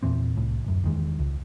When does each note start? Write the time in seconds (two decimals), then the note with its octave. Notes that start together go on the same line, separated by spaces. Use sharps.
0.03 E2 A#2 E3 C4
0.36 C2 A2
0.64 D1 F#2
0.84 E2 D#3 G#3
1.19 C#2